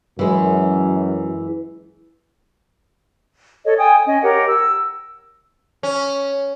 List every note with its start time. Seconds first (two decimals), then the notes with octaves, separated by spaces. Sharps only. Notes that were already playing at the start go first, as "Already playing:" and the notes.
0.19 F#2 E3 G#3
3.65 A4 C#5 D#5
3.78 G5 G#5 D#6
4.06 C#4 D#5 G#5
4.22 G4 A#4 C#5 F#5
4.48 E6
5.83 C#4